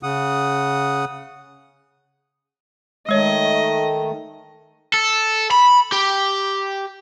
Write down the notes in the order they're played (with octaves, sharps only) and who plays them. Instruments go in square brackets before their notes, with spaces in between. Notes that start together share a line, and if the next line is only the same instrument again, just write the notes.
[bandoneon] C#3 F#5 D#6
[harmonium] D#3 A3 [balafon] G#3 C#5 [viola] D#5
[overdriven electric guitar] A4
B5
G4